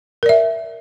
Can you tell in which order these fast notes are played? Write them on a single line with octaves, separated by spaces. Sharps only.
A#4 D5 E5